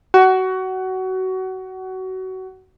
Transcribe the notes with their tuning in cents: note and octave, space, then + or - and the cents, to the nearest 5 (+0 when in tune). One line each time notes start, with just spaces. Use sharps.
F#4 +20